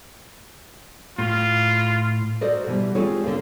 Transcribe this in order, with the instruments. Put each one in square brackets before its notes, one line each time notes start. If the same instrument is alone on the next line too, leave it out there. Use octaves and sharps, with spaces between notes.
[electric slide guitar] A2 [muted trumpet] F4
[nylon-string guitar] F#4 A4 A#4 C5 D5 D#5
B2 E3 G3
G#3 C4 F4 G4 A4 C#5
D3 A#4 C5 F5